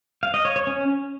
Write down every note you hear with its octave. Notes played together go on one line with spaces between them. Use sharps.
F5
D#5
C#5
C#5
C#4